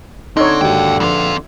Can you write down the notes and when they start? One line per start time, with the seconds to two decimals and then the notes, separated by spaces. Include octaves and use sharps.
0.37 D3 C4 D#4 C#5 E6 G#6
0.61 D#2 G#2 F#4 F5 G5
1.00 A#1 F2 F4 B4